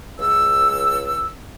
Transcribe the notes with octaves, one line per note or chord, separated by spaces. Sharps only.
C#2 E6